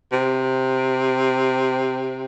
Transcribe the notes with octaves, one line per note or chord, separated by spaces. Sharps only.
C3